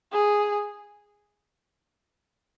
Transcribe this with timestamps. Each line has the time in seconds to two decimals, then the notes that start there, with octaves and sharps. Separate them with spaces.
0.12 G#4